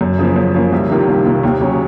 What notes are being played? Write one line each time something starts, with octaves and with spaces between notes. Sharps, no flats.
F#2
C#3 F3 A#3
F#2
C#3 F3 A#3
C2
C3 D#3 A#3 F4
C2
C3 D#3 A#3 F4
D#2
C#3 F#3 C#4